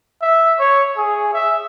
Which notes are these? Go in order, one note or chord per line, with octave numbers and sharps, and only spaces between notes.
E5
C#5
G#4
E5